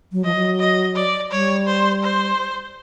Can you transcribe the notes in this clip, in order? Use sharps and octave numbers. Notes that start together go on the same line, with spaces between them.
F#3
F3 D#5
F#3
D#5
D5
G3 C#5
C5
C5